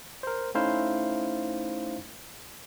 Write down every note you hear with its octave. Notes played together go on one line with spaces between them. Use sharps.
A#4 C5
A3 C#4 D#4 E4 C5 F5